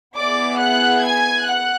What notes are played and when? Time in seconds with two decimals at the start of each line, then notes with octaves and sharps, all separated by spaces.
0.17 B3 E4 G#4 D5 D6
0.60 F#5 F#6
1.04 G#5 G#6
1.46 F#5 F#6